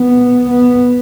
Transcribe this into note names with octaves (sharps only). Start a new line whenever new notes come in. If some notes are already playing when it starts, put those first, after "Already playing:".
Already playing: B3
B3